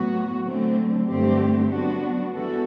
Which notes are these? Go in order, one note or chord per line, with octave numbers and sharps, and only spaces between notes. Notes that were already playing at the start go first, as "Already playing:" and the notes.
Already playing: A2 F#3 B3 F#4
D3 F#3 A3 C4
G2 D3 A3 C4 G4
F#3 B3 D4 F#4
E3 G3 B3 F#4 A4